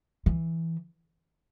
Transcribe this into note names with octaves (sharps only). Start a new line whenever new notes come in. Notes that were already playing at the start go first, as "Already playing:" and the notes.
E3